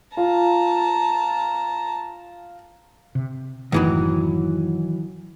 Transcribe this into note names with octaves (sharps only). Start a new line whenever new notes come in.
F4 A5 A#5
C3
F#1 A2 D#3 E3 F#3